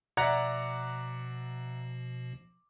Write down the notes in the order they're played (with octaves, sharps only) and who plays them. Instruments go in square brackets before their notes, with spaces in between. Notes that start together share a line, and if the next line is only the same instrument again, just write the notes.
[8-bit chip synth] B2 F3 [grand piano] D5 E5 [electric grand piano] F#5 A#5 G#6